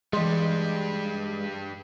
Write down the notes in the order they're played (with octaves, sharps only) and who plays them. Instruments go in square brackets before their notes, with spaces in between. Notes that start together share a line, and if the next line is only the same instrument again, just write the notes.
[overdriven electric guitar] G2 G3 [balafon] E3 C6 [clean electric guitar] G#3